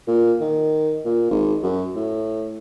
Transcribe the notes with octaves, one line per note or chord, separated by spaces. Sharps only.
A#2
D#3
A#2
G#1
F#2
A2